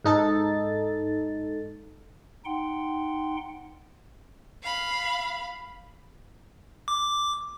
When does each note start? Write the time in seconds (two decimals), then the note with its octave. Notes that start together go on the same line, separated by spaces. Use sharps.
0.04 G#2 D#4 A4 A6
2.45 D#4 F#5 G5 C6
4.63 F5 B5
6.88 D6